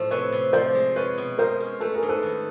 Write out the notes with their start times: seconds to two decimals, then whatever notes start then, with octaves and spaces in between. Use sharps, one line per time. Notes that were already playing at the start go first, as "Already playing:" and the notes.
Already playing: A2 F3 A3
0.11 C3 B4 C#5
0.33 C3
0.53 F3 C5 D5
0.75 G#3
0.96 F4 B4 C#5
1.18 B2
1.38 G#3 A#4 C5
1.60 C#4
1.80 A3 A4 B4
1.94 G#4 A#4
2.03 G#2
2.09 A4 B4
2.23 D#3